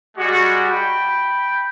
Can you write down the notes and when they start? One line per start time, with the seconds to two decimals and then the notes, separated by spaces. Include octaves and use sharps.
0.17 G3 G#3 F#4
0.70 G5 B5